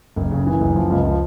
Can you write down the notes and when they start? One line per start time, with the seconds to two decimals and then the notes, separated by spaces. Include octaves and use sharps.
0.16 F#1
0.31 C#3
0.46 E3
0.61 F#1
0.76 F3
0.90 C#2
1.05 F3